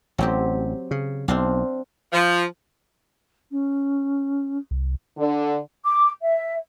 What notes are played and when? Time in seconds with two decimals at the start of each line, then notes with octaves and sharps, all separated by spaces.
0.18 A1 F#3 C4 G4
0.91 C#3
1.28 B1 C4 D4 F5
2.13 F3
3.51 C#4
4.71 C2
5.18 D3
5.84 D6
6.22 E5